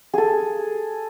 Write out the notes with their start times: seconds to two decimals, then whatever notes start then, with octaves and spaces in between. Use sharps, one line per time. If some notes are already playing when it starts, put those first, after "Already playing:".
0.14 G#4 A4